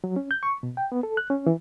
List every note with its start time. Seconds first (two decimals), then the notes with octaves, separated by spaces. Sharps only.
0.04 F#3
0.16 C#4
0.31 G6
0.43 C#6
0.63 B2
0.77 G5
0.92 B3
1.03 A4
1.17 F#6
1.30 C#4
1.47 E3